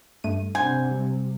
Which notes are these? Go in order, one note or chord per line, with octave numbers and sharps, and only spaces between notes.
G2 A3 D#7
C3 D4 C5 F#5 G#5 G6
G3